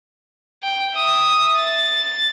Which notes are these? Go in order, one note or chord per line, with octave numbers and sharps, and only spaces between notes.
G5
E5 D#6
A6